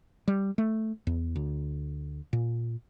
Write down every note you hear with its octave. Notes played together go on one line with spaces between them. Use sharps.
G3
A3
E2
D2
A#2